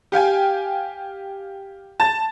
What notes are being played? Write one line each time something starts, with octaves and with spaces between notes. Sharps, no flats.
G4 F5 G5 G#5
A5 A6